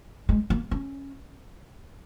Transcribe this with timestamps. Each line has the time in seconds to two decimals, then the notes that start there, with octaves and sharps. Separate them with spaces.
0.29 G#3
0.50 A#3
0.71 C#4